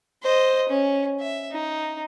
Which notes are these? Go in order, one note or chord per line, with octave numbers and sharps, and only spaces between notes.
C5 D#5
C#4
E5
D#4